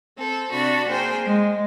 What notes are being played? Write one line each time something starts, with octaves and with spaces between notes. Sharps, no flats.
C4 A4
C3 D4 F#4 B5
A#3 G#4 C5 G5
G#3